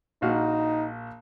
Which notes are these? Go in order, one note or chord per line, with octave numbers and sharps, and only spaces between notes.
A#1 D#4 F#4 F5